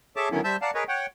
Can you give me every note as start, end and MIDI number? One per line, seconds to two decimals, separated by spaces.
0.16 0.29 68
0.16 0.29 69
0.16 0.29 73
0.16 0.29 76
0.16 0.29 81
0.16 0.29 86
0.31 0.41 50
0.31 0.41 51
0.31 0.41 54
0.31 0.41 59
0.31 0.41 61
0.31 0.41 64
0.44 0.56 55
0.44 0.56 72
0.44 0.56 76
0.44 0.56 81
0.44 0.56 88
0.44 0.56 91
0.62 0.71 70
0.62 0.71 74
0.62 0.71 77
0.62 0.71 78
0.62 0.71 81
0.75 0.84 68
0.75 0.84 70
0.75 0.84 71
0.75 0.84 73
0.75 0.84 75
0.88 1.06 73
0.88 1.06 78
0.88 1.06 79